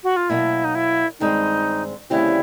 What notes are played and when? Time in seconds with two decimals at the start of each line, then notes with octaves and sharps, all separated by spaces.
0.04 F#4
0.17 F4
0.30 B2 F#3 A#3 E4
0.65 D#4
0.75 E4
1.20 G2 D#3 G#3 C4 D#4
2.10 D2 C#3 E3 G3 C4 E4